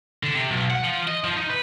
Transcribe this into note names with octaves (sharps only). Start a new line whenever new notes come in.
D3
C3
B1
F#5
F3
D#5
F3
D#4
B4